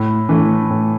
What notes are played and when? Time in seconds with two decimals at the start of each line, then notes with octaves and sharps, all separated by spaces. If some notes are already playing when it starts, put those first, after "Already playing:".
Already playing: A2
0.29 E3 A3
0.70 A2